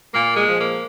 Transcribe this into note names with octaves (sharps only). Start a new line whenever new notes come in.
A#2 A#3
G#3
F3
A#3